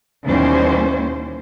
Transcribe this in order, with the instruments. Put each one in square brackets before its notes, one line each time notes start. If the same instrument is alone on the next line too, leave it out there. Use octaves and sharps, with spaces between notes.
[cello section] D#2 B2 E3 G3 C#4 C5